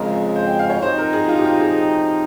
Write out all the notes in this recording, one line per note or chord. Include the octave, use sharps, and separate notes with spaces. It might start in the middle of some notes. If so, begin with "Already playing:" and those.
Already playing: F2 C#3 G#3 A#4
C5
G5
F5
C#5
C3 F3 C4 D#4 C5
A#4
G#4
F4
G4
F4
G#4